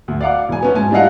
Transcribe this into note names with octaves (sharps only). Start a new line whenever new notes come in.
D2
D5 F5 F#5 D6
E1 G#5
B3 C#4 F#4
G#2 G#5 A5
G3 D4 E4 D#5 F5 F#5